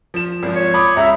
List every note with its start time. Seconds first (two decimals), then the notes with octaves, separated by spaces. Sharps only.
0.14 F3 E7
0.43 G#1 F3
0.55 C#5
0.74 B5 D6 D#6
0.97 C#2 E5 A#5